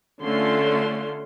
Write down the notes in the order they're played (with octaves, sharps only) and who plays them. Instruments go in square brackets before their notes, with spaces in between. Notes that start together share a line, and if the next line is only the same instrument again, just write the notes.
[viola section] D3 A3 C#4 F4 C6